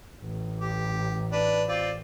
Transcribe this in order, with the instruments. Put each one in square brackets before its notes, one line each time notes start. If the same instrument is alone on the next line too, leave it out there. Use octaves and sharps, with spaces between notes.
[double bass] A1
[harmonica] G4
D4 B4
C4 F4 D5